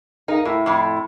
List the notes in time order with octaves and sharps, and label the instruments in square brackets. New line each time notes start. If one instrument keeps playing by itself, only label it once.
[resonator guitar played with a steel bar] D#4 [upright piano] A#4 F5
[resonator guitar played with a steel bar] A2 [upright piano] E4
[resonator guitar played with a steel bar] F2 A2